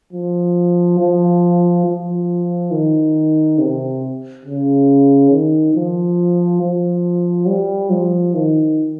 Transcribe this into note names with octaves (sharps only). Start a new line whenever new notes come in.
F3
F3
F3
D#3
C3
C#3
D#3
F3
F3
G3
F3
D#3